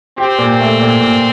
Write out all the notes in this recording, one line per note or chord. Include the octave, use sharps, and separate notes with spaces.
C4 G4
A#2
A3
A#2
A#2